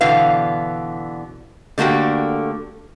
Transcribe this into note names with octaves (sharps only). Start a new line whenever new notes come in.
B2 D3 E3 B3 F5
D3 A3 A#3 F#4 G4